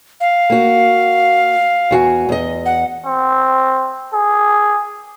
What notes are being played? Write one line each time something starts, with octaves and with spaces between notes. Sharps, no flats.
F5
A#3 F#4
E2 F#4 G#5
E2 D#5
F#5
C4
G#4